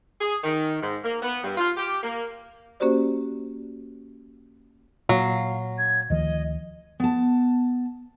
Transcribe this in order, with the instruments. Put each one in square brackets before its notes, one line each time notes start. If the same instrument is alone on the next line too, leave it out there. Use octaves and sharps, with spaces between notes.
[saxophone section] G#4
D#3
G#2
A#3
B3
G2
F4
G4
A#3
[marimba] A#3 C#4 F#4 G4 C5 D5
[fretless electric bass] A#2 [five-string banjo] F#3 [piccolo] F5
[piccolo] G#6
[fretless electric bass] D2 D#3 F3 [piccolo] D#5
[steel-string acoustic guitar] B3 A5